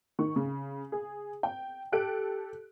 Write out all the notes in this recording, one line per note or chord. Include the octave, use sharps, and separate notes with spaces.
D#3 C#6
C#3
G#4
G5
G4 A4 F#6 D7